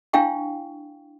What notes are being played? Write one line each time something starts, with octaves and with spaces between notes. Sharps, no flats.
D4 E4 F5 G5 C#6